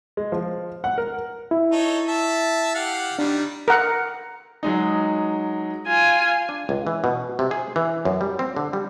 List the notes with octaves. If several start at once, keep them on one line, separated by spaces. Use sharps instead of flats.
G#3
F3
F#5
A#4
E4
D#4 A4 C#5
E5 A5
G4 F5 F#5
D#3 G3 D4
A#4 F#5
F#3 G#3 D#4
F4 G#5
D4
C#2
E3
B2
C3
G#4
E3
F#2
G3
C4
D3
G3